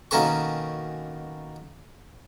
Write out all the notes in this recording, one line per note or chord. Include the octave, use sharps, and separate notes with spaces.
B2 D#3 A#3 C#4 A4 C#6